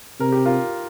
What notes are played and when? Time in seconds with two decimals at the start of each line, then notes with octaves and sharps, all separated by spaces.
0.19 C3 A#4
0.32 G4
0.46 F4 A#4